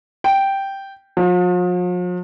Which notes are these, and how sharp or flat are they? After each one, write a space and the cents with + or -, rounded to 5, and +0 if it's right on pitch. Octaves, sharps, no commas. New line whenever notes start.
G5 -5
F3 +45